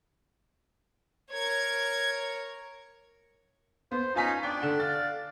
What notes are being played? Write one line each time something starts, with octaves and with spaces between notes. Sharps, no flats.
A#4 C#5 G#6
B3 C5
C#4 D#4 F4 G#5 B6
D4 D5 G5
D3 F#5
F5 A6